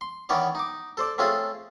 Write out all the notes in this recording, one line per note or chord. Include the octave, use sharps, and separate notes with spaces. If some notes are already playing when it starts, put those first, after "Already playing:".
C6
D#3 E3 B3 C#4 C#5 D5
D#4 D6
A4 C5 D5
A3 C4 C#4 F4 G#4 A4